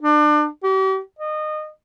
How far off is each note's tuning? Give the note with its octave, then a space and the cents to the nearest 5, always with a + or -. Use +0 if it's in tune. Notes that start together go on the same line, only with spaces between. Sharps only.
D4 +30
G4 -40
D#5 -25